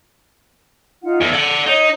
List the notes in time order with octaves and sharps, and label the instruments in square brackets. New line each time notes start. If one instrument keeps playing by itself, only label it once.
[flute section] D#4 F4 F#5
[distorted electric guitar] E2 [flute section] A4
[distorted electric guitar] D5 F#5
[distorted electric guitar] D#4 [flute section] C#5 D#5